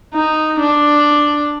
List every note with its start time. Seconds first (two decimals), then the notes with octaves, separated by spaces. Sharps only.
0.14 D#4
0.60 D4